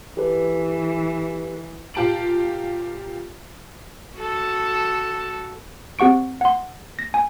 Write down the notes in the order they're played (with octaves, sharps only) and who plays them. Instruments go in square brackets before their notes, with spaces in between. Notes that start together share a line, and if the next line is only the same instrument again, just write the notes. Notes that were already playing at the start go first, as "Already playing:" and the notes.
[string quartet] E3 [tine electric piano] G4 A4 B4
[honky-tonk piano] A#2 F4 G4 A5 D7 F#7
[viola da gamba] F#4 A4
[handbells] C4 G4 F#5 C#6 D7
F#5 C6
A#6
G#5